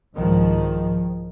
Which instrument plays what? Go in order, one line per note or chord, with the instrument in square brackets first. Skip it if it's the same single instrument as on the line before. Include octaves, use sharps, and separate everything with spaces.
[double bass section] C2 G#2 D#3 F3